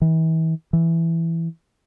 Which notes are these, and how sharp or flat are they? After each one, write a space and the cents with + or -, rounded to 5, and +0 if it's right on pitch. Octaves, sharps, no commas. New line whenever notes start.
E3 -40
E3 +5